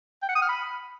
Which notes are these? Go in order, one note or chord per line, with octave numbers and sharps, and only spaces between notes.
G5
F#5
D#6
F6
B5